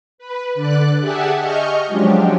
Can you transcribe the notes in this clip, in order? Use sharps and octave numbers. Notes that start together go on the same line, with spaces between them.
B4
D3 D5 F#6
G4 G#4 E5 F#5 G#5 A5
D#5 C#6 F6 G6
F3 F#3 G#3 C#4 D4 G4